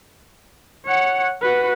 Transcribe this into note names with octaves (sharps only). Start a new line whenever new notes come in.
C#5 F#5
F#4 B4